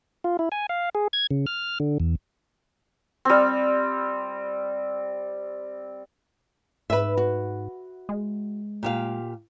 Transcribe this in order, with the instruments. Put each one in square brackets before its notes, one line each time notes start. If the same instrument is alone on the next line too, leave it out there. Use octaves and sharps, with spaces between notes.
[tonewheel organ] F4
E4
G#5
F5
G#4
G#6
C#3
F6
D3
E2
[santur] G3 C4
[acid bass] G#2 [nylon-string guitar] B4 E5
[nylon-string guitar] F#4
[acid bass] G#3
[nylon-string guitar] A#2 G4 F5